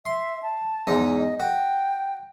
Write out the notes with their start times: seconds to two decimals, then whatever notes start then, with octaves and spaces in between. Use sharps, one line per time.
0.06 E5 C6
0.43 A5
0.87 E2 G#2 D#4
1.18 D#5
1.40 F#4 G5